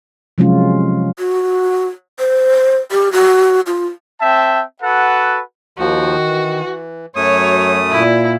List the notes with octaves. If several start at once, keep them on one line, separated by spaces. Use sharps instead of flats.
C3 F3 F#3 G#3 C#4 F4
F#4
C5
G4
F#4
F4
C4 E5 G5 A5
F#4 A4 B4 F#5
D#2 D#3 F3 F#4
E3
F#2 F#3 A3 C#5 D#6
A#2 E4